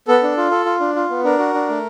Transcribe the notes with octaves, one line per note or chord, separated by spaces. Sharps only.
B3 A4
D4
F4
A4
F4
D4
F4
B3
D4 A#4
F#4
D4
A3